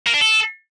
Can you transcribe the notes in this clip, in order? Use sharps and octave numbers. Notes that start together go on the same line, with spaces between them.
A#3
D4
A4